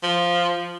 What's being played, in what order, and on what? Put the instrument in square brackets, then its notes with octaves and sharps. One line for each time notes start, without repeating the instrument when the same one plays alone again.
[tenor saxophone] F3